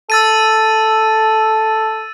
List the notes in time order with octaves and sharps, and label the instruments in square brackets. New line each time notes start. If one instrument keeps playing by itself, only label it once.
[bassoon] A4 [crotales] E6 A6 D#7